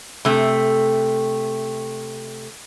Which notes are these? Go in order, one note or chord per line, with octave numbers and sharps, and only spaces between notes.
C3 A3